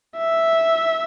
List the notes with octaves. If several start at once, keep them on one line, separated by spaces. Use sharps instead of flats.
E5